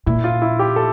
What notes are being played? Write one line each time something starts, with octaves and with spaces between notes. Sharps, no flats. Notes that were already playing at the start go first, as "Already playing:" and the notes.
A#2 E4
F4
E4
G4
A4